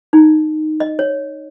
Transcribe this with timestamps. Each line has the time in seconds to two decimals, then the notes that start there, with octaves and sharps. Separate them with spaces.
0.13 D#4
0.80 D#5
0.99 C#5